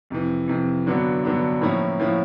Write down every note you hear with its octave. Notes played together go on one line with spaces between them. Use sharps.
F2 C3 E3
F2 C3 E3
G2 D3 F#3 B3 D4
G2 D3 F#3 B3 D4
A2 F3 A#3 C#4 E4
A2 F3 A#3 C#4 E4